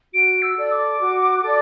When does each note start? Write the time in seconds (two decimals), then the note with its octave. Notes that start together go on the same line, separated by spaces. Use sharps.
0.13 F#4 D7
0.42 E6
0.56 A4 D5
0.71 D6
1.00 F#4
1.43 A4 D5